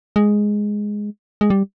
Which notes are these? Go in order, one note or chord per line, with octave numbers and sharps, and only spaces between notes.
G#3
G#3
G3